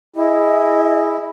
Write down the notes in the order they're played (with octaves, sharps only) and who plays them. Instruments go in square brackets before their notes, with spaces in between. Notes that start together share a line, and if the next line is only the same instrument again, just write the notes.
[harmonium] E4 [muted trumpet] G#4 [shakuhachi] D#5